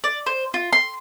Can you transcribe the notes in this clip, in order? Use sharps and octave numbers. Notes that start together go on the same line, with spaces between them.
D5
C5
F4
C6